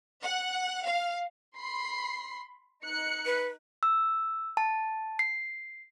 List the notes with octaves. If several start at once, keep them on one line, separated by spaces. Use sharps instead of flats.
F#5
F5
B5 C6 C7
D#4 F#6 C#7
B4
E6
A5
C7